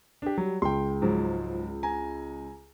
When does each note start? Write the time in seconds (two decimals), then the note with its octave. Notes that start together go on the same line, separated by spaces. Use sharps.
0.22 D4 G4
0.38 F#3 G3
0.62 C#2 G5 C6
1.02 G#2 F3 F#3
1.83 G#5 A#5